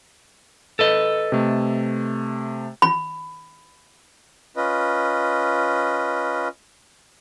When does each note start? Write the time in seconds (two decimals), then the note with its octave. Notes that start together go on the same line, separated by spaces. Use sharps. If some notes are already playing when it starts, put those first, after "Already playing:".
0.79 A4 B4 D#5
1.32 C3 A3
2.82 B5
4.56 C#4 F4 B4 D#5